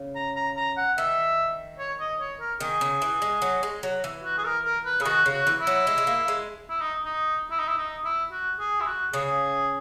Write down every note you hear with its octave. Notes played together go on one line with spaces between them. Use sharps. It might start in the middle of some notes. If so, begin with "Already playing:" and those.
Already playing: C#3
A#5
A#5
A#5
F#5
D#3 E5
C#5
D#5
C#5
A#4
D#3 G#4
C#3
E3
G#3
F#3
G#3
F#3
E3
F#4
G#4
A#4
A#4
B4
C#3 G#4
D#3 F#4
C#3
F#4
E3
E4
F#3
G#3
G#3
A#3
G#3
E4
D#4
D#4
E4
D#4
E4
D#4
E4
F#4
G#4
E4
F#4
C#3 G#4